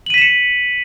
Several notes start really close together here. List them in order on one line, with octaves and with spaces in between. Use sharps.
F#7 D#7 B6 E7 C#7